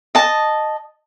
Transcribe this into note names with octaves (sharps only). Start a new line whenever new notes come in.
D#5 A5